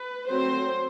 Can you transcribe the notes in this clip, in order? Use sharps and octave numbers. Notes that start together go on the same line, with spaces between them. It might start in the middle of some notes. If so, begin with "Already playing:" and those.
Already playing: B4
F#3 A3 C4 C5